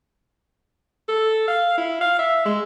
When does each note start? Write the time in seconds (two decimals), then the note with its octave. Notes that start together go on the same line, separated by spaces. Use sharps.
1.09 A4
1.48 F5
1.78 E4
2.01 F5
2.19 E5
2.45 G#3